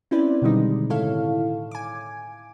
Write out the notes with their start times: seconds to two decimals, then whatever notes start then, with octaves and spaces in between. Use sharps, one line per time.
0.11 C4 C#4 E4 B4 C5 D5
0.42 B2 D3 D#3 G3 G#3 D#4
0.90 A2 E4 A4 C#5 F5
1.71 G#5 D6